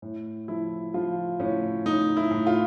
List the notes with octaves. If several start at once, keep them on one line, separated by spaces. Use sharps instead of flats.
A2
F3 E4
F3 F4
A2 C#4
A2 D#4
E4
A2
F4